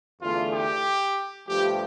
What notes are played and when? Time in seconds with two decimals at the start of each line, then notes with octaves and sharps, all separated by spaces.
0.21 E2 D3 A3 F4
0.53 G4
1.48 G2 F3 A3 G4